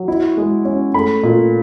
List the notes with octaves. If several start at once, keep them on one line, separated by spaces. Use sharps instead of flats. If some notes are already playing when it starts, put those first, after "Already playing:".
Already playing: F#3
E4
G#3
C#4
A3 B5
A#2